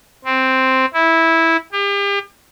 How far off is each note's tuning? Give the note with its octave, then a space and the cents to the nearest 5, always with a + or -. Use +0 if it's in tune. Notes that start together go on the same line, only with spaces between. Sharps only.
C4 +0
E4 -10
G4 +40